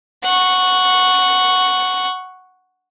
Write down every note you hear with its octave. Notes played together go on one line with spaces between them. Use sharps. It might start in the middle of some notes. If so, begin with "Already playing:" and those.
F#5 C#6